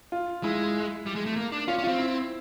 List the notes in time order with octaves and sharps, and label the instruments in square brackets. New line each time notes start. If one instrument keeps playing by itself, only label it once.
[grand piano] F4
[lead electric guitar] G#3 [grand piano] E4
[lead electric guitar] G3
G#3
A3
A#3
D4
[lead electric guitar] C#4 [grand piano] F4
[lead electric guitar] C#4
[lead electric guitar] C4 [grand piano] F4
[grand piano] E4